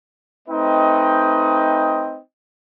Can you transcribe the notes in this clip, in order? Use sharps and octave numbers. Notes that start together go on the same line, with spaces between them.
A3 C4 D#4 B4 D#5 G5